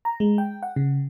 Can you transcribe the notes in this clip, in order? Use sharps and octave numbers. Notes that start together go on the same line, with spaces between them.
A#5
G#3
G5
F#5
C#3